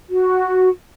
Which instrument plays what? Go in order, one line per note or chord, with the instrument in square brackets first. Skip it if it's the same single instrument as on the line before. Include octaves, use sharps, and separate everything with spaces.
[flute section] F#4